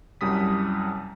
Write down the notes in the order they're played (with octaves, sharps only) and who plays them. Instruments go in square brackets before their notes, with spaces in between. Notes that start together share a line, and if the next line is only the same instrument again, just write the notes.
[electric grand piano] C2 F#2 G3 D#6 B6